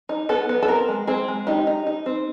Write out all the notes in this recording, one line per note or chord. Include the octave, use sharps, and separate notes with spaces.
D#4
B3 A4
B3
A4
C4 A#4
G#3
C4 G#4
G#3
D#4 G4
D#4
D#4
C4